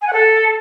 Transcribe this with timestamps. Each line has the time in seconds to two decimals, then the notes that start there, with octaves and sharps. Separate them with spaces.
0.02 G#5
0.07 F#5
0.13 A4